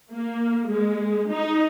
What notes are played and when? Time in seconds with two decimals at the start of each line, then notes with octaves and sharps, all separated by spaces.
0.12 A#3
0.70 G#3
1.32 D#4